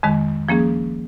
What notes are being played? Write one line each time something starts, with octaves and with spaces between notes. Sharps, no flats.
F2 D#3 G#3
F3 A#3 C#4 G#4